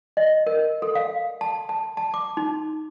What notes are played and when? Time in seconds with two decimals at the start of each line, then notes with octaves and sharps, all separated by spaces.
0.17 D#5
0.47 A#4
0.82 A4
0.95 F5
1.41 A5
1.69 A5
1.97 A5
2.14 D6
2.37 D#4